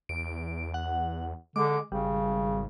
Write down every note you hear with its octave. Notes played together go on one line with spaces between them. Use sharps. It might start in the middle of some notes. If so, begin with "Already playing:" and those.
E2 D7
F#5
D3 G#3 D6
G#1 C#3 G3